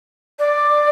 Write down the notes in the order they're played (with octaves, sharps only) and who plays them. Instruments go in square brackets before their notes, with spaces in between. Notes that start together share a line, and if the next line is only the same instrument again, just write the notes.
[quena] D5